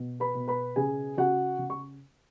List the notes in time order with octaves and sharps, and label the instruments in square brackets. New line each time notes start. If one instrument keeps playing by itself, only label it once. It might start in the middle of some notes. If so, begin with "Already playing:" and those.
Already playing: [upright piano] B2
B4 B5
B2
B4 B5
C#3 G#4 G#5
C#3 F#4 F#5
C#3
C#6